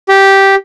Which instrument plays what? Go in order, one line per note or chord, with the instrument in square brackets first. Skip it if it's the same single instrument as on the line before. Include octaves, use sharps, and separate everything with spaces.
[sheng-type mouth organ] G4